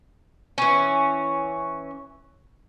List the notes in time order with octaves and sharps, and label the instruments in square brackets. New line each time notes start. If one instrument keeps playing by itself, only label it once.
[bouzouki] E3 C#4